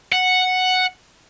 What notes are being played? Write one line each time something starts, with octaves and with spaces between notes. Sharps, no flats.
F#5